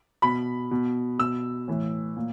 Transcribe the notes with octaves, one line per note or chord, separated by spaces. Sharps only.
B2 B5
B2
B2 E6
A2 E3
A#2